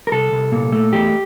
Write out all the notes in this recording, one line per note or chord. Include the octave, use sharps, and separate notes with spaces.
A#4
C2 A4
C2
A#2
A3
E2 G4